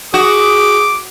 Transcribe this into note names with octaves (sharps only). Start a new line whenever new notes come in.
F#4 G#4 D6 D#6